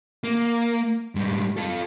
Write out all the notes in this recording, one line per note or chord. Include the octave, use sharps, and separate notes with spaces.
A#3
G#2 G3
F4 A4